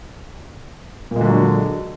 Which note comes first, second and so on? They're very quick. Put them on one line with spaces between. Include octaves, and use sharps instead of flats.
A#2 G#3 D3 F#3